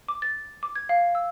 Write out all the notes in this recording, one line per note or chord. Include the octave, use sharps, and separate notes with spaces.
D6
A6
D6
G#6
F5
E6